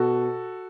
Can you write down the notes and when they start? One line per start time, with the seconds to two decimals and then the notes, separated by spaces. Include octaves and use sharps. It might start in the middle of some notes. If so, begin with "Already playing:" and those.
Already playing: B2 F#4 A4